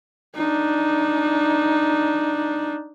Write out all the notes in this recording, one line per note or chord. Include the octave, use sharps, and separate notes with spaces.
D4 D#4